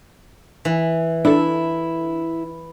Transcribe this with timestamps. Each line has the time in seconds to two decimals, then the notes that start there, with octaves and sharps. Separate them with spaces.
0.65 E3
1.25 D4 E4 A4